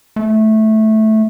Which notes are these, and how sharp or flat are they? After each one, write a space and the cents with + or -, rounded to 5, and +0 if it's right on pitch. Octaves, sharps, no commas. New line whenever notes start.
A3 -10